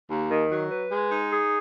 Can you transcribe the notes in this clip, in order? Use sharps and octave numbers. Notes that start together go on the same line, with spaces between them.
D#2
D#3
F#3
B4
G#3
D#4
G#4